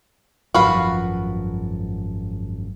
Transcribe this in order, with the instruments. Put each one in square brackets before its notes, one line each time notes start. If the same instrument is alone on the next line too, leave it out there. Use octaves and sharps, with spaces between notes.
[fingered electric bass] G#1 F#2 F3 [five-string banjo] F#4 B4 F5